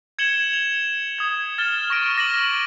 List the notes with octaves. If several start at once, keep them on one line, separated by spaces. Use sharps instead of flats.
G#6 C#7 E7 F#7 G7
F7
D#6 G#6
F6 A6 E7 G7
C#6 A#6 D7
D6 A#6 D#7 F#7